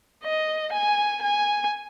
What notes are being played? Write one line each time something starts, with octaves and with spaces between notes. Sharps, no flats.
D#5
G#5
G#5